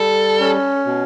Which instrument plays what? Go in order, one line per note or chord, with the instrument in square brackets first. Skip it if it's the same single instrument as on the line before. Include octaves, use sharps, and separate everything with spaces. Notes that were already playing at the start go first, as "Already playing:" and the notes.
Already playing: [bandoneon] G3 [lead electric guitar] A4
[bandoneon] C#4
B2